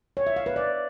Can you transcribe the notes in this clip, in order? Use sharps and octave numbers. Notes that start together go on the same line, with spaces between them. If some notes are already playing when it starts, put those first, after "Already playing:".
C#5
E5
F5
B4
D5